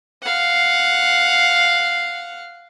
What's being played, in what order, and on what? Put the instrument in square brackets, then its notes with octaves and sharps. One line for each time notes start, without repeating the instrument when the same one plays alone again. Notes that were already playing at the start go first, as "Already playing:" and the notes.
[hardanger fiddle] F5 F#5